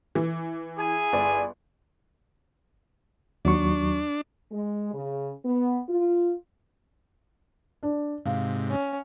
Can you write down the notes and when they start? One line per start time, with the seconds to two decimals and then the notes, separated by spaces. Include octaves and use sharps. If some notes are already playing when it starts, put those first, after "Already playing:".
0.15 E3
0.77 E4 G#4 G#5
1.13 G1 D5
3.45 D#2 F#3 D4 C#6
4.52 G#3
4.94 C#3
5.44 B3
5.88 F4
7.83 D4
8.25 G#2 C3 F5
8.70 C#4